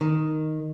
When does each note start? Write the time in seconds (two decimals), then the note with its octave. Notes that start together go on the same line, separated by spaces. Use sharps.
0.01 D#3